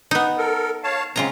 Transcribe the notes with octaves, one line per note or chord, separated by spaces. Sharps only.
B3 D#4
A4 A#4
C#5 F5 A5
C#3 F#3 G#3 C4 F4 A#5